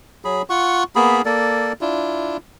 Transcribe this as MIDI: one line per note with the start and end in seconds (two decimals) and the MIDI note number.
0.25 0.42 54
0.25 0.42 68
0.25 0.42 83
0.50 0.83 65
0.50 0.83 78
0.50 0.83 85
0.96 1.22 58
0.96 1.22 59
0.96 1.22 68
0.96 1.22 83
1.25 1.73 58
1.25 1.73 69
1.25 1.73 74
1.81 2.37 62
1.81 2.37 64
1.81 2.37 65